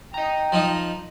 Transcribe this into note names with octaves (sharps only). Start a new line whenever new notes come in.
D#5 G5 A#5
F3 D#4